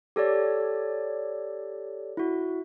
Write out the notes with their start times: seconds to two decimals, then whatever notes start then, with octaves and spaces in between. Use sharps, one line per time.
0.16 G4 A4 C#5 D5
2.17 E4 F#4